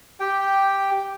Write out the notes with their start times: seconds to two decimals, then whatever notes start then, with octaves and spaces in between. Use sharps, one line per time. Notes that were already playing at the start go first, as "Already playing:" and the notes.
0.20 G4 G5